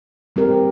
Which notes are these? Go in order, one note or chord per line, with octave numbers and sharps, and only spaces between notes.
G3 C4 G4 A#4